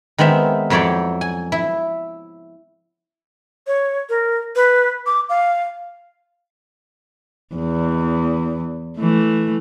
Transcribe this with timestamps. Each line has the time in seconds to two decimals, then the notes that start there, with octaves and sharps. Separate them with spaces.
0.18 D#3 G#3 B3 C4 E5
0.70 F2 F#3 E4 C#5 D5 G5
1.21 G#5
1.52 E4
3.67 C#5
4.09 A#4
4.56 B4
5.06 D6
5.30 F5
7.55 E2
8.98 E3 A3